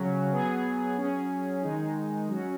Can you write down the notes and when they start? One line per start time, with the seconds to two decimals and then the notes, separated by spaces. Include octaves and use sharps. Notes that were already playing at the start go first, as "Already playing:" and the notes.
Already playing: C#3 F#3 C#4
0.31 F#3 B3 G#4
0.96 F#3 C#4 G#4
1.62 D#3 G#3 D#4 G#4
2.28 F#3 C#4 F#4